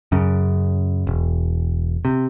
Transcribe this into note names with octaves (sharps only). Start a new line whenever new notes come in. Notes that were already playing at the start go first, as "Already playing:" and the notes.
F#2 C#3
E1
C3